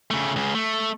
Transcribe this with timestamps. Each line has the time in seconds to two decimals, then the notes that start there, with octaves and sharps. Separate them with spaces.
0.11 C#3 A3
0.36 C#2 C#3
0.55 A3